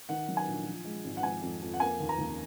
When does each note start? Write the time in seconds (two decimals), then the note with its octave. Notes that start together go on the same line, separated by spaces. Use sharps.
0.09 D#3 F#5
0.28 F#3
0.37 G#5
0.48 A#1
0.66 F3
0.85 G#3
1.05 G#1
1.17 F#5
1.23 F3 G#5
1.42 F2
1.62 F2
1.74 F#5
1.80 A#3 G#5
2.00 D#2
2.09 A#5
2.18 D#2